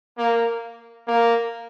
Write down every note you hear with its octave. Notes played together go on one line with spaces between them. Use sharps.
A#3
A#3